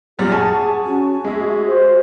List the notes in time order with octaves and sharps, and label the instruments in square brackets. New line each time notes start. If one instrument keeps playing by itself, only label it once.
[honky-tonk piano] F#2 A#2 G3 [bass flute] G#4
[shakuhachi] F#5 [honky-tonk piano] G#5 A5 C#6
[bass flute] C#4 [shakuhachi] F#4
[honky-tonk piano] G#3 E5 [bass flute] G#4
[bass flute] C5